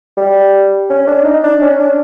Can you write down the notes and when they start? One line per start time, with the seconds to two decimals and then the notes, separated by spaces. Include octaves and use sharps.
0.17 G3
0.90 C#4
1.07 D4
1.25 D#4
1.43 D4
1.61 C#4
1.80 D4